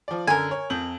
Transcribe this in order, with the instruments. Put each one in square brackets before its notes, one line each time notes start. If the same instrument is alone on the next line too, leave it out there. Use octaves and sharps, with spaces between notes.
[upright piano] F3 D5
[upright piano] F#2 D3 [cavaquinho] A#4 G#5
[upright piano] C#5
F2 G6 F#7